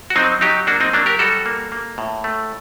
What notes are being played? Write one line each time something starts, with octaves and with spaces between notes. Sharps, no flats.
F#4
F#3 C4 D#4
F#3 D#4 G4
A#3 D4 F#4
C4 D#4
F#3 A#3 D4
G4 A#4
G3 F#4 A4
A#3
A#3
A2
A3